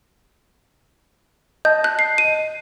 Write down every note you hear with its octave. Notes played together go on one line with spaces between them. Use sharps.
D#5 A5 G6
F#6
C7
D#7